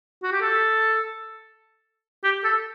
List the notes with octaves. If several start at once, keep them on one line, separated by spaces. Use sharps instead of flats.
F#4
G4
A4
G4
A4